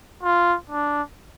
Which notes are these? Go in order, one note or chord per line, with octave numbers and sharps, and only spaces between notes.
F4
D4